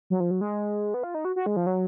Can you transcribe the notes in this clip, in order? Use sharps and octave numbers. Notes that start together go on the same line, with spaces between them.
F#3
F3
F#3
G#3
B3
F4
D#4
F#4
F#4
G#3
F3
F#3